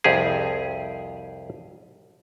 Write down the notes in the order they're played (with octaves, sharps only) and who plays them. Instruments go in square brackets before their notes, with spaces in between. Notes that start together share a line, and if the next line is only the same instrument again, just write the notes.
[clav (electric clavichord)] C2 F2 G4 G#4